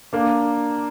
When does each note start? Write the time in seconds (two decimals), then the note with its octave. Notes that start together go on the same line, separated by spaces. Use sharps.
0.13 A#3 D4